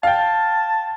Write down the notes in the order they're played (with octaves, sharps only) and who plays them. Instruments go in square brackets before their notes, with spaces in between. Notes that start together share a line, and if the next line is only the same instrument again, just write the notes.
[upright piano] F5 G5 [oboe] A5